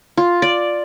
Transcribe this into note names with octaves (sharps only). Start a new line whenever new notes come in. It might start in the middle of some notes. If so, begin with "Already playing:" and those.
F4
D5